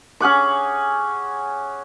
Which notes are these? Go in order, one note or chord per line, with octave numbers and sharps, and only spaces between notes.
C#4 G#4 F#5 D6